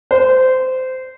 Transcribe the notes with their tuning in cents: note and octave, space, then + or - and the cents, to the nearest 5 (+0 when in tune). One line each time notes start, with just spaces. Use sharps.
C5 -20